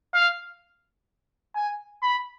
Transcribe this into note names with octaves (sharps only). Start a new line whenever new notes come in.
F5
G#5
B5